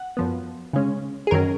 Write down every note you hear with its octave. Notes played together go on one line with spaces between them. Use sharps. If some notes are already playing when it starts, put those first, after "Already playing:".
Already playing: F#5
F#2 F3 B3
C#3 G#3 C#4
G#4
F#2 D#3 F#3 C#4 A#4